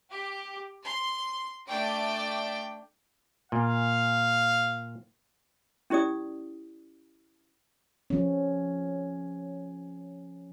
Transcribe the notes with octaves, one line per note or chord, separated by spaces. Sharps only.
G4
C6
A3 D4 D5 G5 D7
A#2 F5
C#4 E4 G4 D5 D#6
F3 C#4